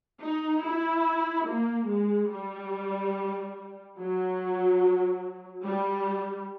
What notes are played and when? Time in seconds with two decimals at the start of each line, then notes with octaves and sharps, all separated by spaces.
0.22 D#4
0.64 E4
1.47 A#3
1.89 G#3
2.31 G3
3.97 F#3
5.64 G3